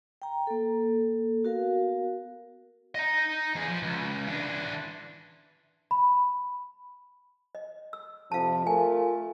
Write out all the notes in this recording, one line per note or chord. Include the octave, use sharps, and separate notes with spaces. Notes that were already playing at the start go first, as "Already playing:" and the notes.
G5 A#5
A#3 A4
B3 F#4 A#4 F5
D#5 A#5
E2 G#4
F3
C#2
E3 D4
B5
D#5
E6
F2 C3 F3 F5 A5
A3 F4 A#4 G#5